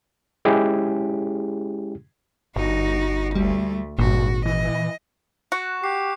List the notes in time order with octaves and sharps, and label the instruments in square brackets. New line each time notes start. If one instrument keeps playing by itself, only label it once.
[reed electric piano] G#3 C#4 E4 G4 G#4
[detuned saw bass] G1 [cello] D#4 F#4
[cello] D2 A3 [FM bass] G3
[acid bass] G#1 [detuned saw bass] G2 [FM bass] A#2 [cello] F#4
[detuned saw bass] E3 [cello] D#5
[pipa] F#4 [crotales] C#6 F#6
[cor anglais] G4 [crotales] C7